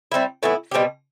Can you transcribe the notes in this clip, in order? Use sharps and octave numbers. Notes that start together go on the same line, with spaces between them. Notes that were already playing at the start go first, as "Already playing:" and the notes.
G3 C4 E4
A2 E3 B3 E4
B2 G3 C4 G4